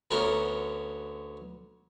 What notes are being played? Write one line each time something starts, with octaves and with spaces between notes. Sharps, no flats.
D2 D3 B3 C#4 F#4 A#4